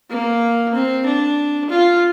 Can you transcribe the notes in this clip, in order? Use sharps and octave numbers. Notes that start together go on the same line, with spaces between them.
A#3
C4
D4
F4